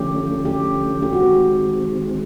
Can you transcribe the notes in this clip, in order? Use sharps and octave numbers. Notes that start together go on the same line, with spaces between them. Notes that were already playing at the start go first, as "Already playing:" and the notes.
Already playing: D3 F3 A3 C#4 G4
G4
G4
D#3 G#3 C4 F#4